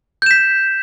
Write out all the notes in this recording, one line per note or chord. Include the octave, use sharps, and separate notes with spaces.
G6 B6 E7